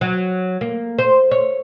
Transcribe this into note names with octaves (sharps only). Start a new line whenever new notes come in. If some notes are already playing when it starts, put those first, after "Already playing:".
F#3
A#3
C5
C#5